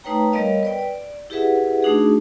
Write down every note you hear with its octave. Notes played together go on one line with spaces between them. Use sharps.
A3 D#4 B4 C#5 G5 A#5
G3 B3 A#4 C#5 D#5 F5
B4 D5 G5
D5
E4 G4 G#4 B4 E5 F#5
A3 D4 D#4 F#4 G#4